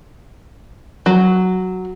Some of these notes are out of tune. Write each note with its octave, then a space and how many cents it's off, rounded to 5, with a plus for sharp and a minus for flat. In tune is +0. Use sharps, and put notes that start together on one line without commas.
F#3 +0